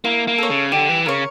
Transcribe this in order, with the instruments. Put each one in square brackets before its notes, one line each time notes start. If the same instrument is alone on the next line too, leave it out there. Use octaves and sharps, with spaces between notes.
[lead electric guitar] A#3 [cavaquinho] E4
[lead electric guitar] A#3
[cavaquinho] A4 C#5
[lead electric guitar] C#3
[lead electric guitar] D3 [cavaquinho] G4
[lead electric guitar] E3
[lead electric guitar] C#3 [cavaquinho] A#4 C#5